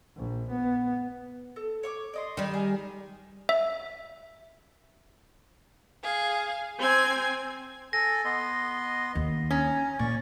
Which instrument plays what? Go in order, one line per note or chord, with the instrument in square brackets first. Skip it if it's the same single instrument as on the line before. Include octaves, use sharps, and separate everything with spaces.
[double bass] A#1
B3
[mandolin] A4
C#5 C#6 D6
D5 D#5 C6
[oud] D#3 G3
[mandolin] G#4
[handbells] E5
[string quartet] G#4 F5
C4 G#5 G#6
[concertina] A4 G#5 [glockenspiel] A#6
[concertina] B3 D#5 C6
[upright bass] D#2
[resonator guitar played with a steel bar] C#4 [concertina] A#5
[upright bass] A#2 [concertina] D5 C#6